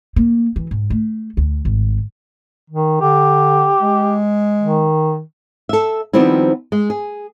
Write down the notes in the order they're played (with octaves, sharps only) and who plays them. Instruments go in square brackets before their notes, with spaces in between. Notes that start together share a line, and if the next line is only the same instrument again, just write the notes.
[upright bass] A#3
E3
G#2
A3
D2
G#1
[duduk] D#3
[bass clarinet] D3 [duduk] G4
[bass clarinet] G#3
[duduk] D#3
[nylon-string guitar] A4 E5
D#3 F3 G3 B3 C4 E4
G#3
G#4